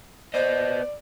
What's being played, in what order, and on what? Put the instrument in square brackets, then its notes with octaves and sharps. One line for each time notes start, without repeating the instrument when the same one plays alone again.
[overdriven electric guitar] B3 D#5 [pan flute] C5 [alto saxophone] D5